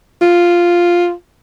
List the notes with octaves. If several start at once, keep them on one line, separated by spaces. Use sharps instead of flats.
F4